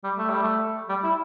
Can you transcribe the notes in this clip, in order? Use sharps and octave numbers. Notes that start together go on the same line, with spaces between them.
G3
A3
G3
A3
G3
E4